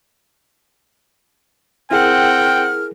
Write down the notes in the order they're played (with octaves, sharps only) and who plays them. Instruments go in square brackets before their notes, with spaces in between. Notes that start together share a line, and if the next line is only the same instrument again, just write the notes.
[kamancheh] C4 F#5 [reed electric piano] E4 G#4 A#4 [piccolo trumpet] G5 [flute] F6